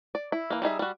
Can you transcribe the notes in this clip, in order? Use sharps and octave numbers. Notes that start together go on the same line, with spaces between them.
D5
E4
E3 A#3
G3 D#4 G#4 E5
G3 F#4